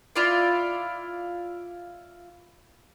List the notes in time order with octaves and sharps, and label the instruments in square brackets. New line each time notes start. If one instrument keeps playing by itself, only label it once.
[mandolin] E4 F4 D5